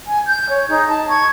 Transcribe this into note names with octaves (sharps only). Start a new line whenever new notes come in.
G#5
G6
C#5
D#4 G#4
A5
C#6 G#6